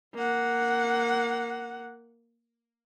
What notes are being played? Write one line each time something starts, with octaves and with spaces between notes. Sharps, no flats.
A#3 F#5